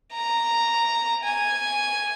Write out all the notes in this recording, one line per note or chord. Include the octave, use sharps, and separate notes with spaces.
A#5
G#5